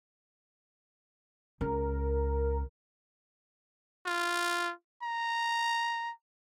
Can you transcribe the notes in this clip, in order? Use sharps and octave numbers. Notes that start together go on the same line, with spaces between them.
C#2 A#4
F4
A#5